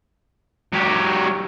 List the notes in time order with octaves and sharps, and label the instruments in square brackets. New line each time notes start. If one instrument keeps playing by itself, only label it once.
[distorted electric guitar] F#3 G4